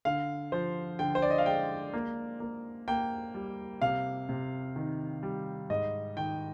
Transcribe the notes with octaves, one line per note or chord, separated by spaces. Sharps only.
D3 F5
F3 C5
D3 G5
C5
D5
D#5
F5
G#3 G5
A#3
A#3
A#3 G5
G3
C3 F5
C3
D#3
G3
G#2 D#5
D#3 G5